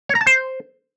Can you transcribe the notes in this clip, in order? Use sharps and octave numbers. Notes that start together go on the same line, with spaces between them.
C#5
A#5
A5
C5